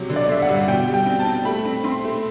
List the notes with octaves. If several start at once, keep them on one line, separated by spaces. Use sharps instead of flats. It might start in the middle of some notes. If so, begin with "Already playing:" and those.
Already playing: C3 F#3
D3
D5
D3 E5
F#5
G2
B2 G5
G3
G5
C4
A5
C4
A3 B5
C4
C4 C6
A3